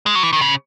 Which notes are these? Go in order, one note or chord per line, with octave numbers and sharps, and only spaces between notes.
G#3
F#3
E3
D#3
C#3